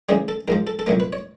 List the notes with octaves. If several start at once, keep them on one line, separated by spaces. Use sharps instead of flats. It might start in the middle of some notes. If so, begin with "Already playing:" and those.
D2 C#3 E3 G3 G#4
A4
A#1 G#2 F3 A#4
A4
A4
C2 A#2 F#3 A3 A#4
B4
C#5